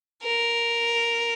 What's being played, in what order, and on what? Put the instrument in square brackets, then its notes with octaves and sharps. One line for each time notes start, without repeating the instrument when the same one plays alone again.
[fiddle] A#4